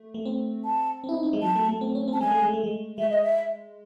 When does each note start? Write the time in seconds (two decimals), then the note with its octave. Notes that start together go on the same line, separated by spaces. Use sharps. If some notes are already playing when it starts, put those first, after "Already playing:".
Already playing: A3
0.14 A3
0.25 C4
0.65 A5
1.04 C4
1.09 E4
1.13 D#4
1.23 C4
1.33 G#3
1.42 F#3 A5
1.55 A3
1.68 A3
1.81 C4
1.95 C#4
2.08 C4
2.13 A5
2.20 G#3 G#5
2.31 A3
2.42 G#3
2.53 A3
2.64 G#3
2.98 G#3 E5
3.10 D#5
3.23 E5